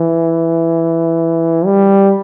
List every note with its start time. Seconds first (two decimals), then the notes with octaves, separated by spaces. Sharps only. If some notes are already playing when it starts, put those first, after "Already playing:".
Already playing: E3
1.66 G3